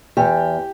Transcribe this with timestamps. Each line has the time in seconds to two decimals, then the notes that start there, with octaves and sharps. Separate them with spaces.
0.17 E2 G4